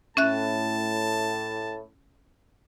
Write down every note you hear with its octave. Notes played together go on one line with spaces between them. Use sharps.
A2 C#4 E5 A5 F#6